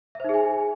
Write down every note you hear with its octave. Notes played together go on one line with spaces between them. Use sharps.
D#4 G#4 C5 E5 G#5